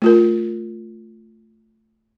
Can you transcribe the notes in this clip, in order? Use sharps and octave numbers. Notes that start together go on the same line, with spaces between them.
A3 F4 A#4